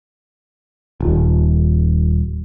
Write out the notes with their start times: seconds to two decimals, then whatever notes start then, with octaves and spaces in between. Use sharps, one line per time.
1.00 D#1